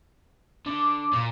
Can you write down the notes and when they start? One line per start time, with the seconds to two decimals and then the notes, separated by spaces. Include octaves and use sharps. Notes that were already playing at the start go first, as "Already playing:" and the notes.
0.66 D3 D6
1.13 A#2